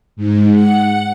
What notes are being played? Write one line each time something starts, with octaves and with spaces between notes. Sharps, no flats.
G#2
F#5